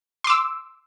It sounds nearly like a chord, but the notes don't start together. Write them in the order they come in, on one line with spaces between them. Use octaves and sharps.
C6 D6 E6